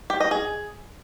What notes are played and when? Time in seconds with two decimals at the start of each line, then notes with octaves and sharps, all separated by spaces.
0.10 G4
0.20 D#5
0.31 G#4